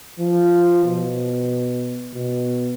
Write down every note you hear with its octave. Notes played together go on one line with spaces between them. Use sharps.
F3
B2
B2